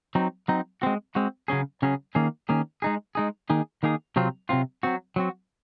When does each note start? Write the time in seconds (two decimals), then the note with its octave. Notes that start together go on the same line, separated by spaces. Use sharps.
0.15 F#3 C4 D#4
0.48 F#3 C4 D#4
0.82 G#3 C4 F#4
1.15 G#3 C4 F#4
1.48 C#3 F#3 C#4 G#4
1.82 C#3 F#3 C#4 G#4
2.15 D#3 A#3 C#4 G#4
2.49 D#3 A#3 C#4 G#4
2.82 G#3 D#4 G#4
3.15 G#3 D#4 G#4
3.50 D#3 A#3 D#4 G#4
3.83 D#3 A#3 D#4 G#4
4.16 C3 F#3 C4 F4
4.49 C3 F#3 C4 F4
4.83 F#3 C4 F#4
5.16 F#3 C4 F#4